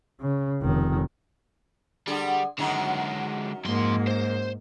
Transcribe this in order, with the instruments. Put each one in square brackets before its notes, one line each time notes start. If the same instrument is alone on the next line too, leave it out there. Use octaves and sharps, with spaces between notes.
[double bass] C#3
F1 D#3
[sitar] D3 G#4 [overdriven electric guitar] G3
[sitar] F#2 D#3 F#3 [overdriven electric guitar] D3 G#3
[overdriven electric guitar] F2 C6 [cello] G#2 A#3
[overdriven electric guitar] C5